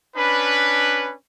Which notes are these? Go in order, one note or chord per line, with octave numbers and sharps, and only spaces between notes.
C#4 D4 B4